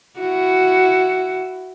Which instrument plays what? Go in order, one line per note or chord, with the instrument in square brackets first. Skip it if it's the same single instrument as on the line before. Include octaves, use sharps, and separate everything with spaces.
[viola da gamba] E4 F#4